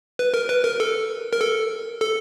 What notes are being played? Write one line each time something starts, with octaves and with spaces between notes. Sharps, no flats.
B4
A#4
B4
A#4
A4
A#4
A4
A4